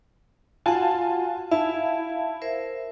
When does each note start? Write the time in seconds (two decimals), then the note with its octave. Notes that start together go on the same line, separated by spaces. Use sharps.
0.66 F4 F#4 F#5 G#5 A5
1.51 E4 E5 F5 A5
2.42 A#4 C5 E5